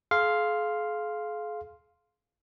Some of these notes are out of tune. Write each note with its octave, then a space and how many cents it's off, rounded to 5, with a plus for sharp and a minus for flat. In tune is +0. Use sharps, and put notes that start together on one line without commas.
G#4 +40 F5 +0 C6 +0